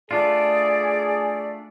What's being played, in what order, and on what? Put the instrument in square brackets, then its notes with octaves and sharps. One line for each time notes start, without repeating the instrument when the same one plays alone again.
[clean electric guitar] A3 D4 F4 [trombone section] G#4 [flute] D5